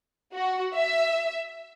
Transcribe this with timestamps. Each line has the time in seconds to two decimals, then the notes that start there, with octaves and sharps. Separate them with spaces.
0.33 F#4
0.74 E5